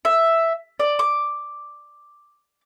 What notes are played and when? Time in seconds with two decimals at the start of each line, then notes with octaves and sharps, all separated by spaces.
0.05 E5
0.80 D5
0.99 D6